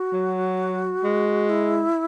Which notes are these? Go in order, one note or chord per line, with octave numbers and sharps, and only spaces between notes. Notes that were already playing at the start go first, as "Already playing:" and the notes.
Already playing: F#4
F#3
G#3
E4